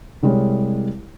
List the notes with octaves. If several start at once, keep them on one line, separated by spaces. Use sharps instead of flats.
C2 G3 G#3 C#5